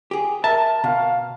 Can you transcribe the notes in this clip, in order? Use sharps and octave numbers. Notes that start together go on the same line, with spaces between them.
G4 G#4
A#4 E5 A5
B2 F5